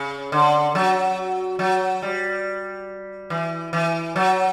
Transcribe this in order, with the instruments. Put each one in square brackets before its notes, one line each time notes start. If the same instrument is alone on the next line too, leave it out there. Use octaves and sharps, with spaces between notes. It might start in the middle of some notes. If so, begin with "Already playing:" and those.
Already playing: [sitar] C#3
D3
F#3
F#3
G3
E3
E3
F#3